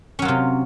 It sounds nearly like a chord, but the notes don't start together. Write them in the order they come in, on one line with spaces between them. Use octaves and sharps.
C#4 F#3 F4 C3